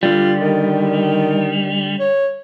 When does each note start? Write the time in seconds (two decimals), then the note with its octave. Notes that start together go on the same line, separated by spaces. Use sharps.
0.03 D3 G3 F4
0.39 D#3
2.00 C#5